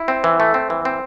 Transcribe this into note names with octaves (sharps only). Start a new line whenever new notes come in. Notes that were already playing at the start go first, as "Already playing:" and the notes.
Already playing: E4
C4
E3
A3
C4
E3
C4